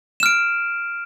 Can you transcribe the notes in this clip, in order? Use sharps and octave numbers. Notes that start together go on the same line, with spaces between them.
F6 D7 E7